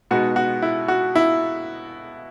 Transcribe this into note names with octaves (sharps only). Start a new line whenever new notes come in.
B2 G#3 B3 D#4 F#4
F#4
E4
F#4
E4